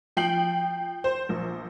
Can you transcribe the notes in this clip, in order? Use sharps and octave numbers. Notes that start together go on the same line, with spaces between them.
F3 G5 C7 F#7
C5
A#1